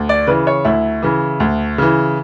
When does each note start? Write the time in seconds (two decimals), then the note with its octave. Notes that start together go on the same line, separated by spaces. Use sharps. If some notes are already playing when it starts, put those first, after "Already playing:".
Already playing: D2
0.09 D5
0.27 C#3 E3 B4
0.47 C#5
0.65 D2 E4
1.03 C#3 E3
1.40 D2
1.78 C#3 E3